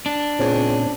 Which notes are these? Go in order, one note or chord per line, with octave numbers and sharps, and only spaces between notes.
D4
C#2 A#2 C4 C#4